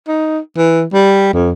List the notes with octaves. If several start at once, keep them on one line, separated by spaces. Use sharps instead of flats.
D#4
E3
G3
F2